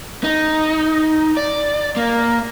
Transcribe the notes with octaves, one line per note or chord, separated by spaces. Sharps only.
D#4
D5
A#3